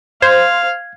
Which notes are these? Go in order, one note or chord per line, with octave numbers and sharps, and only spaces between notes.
C5 F5 G#6